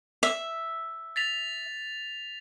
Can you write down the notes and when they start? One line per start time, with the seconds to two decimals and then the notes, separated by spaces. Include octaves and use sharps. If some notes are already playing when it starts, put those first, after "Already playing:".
0.23 E5
1.16 A6 B6 F7